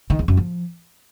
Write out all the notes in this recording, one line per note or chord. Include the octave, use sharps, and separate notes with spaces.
D#3
E2
F#2
F3